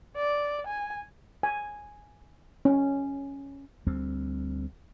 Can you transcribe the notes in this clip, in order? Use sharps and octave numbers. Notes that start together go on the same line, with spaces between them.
D5
G#5
G#5
C#4
D2 G3 C4